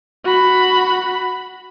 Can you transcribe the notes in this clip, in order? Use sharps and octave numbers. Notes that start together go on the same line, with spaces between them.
F#4 B5